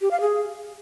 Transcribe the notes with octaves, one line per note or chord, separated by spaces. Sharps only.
G4
F5
G#4